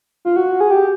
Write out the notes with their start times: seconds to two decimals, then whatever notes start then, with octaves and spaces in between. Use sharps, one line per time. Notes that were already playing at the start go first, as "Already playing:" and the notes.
0.25 F4
0.36 F#4
0.61 G#4
0.71 G4